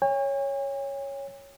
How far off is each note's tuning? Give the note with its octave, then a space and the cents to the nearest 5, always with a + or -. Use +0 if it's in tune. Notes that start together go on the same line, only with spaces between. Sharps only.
C#5 +0 G#5 -45